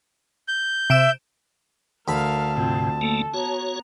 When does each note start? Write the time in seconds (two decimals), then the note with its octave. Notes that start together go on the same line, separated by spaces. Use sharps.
0.48 G6
0.90 C3 E5 D7 E7
2.08 D2 A#4 F5 A5 B5
2.57 G#2 C3 C4 F4
3.01 A3 A#3 A4
3.34 B3 F#4 C#5 A#5